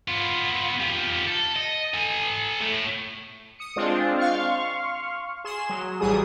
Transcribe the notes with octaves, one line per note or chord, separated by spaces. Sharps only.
B3 F4
F4 G4
A4
D#5
A4 G#5
A2
D#6 C#7
G#3 C4 D4 F4
F5 C6 C#6 F6
G#4 C6 E7
F#3
A1 E3 G3 G#4 D#6